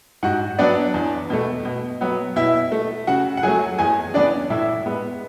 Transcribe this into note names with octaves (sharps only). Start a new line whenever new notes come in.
G#2 F#4 F#5
F#3 B3 D4 D5
E2
B2 A3
B2
F#3 B3
B2 E4 E5
A3
C#3 F#4 F#5
F#5
F#3 A3 G#4 G#5
E2 G#4 G#5
C#3 E3 B3 D4 D5
A2 E4 E5
G#3 B3